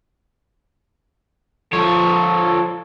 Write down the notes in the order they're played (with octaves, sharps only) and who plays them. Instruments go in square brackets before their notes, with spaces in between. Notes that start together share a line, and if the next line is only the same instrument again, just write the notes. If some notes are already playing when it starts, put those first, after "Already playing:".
[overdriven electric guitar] F3 C#5 [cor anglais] A4